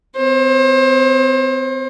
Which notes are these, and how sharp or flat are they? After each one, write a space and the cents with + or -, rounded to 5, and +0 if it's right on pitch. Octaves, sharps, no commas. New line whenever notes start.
C4 -35 C5 +35